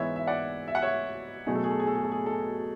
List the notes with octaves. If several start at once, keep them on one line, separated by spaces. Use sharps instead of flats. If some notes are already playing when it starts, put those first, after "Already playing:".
Already playing: G#2 E3 B3 C#5 E5
E5
D5 F#5
E5
F#5
C#5 E5
B2 F#3 A3 G#4
A4
G#4
A4
G#4
A4
G#4
A4
G#4
A4